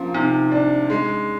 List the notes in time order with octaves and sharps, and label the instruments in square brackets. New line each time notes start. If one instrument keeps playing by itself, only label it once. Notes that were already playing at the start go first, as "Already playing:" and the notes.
Already playing: [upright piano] F3 A#3 [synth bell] C#4
[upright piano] C3 [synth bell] D#4
[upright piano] D4
G#3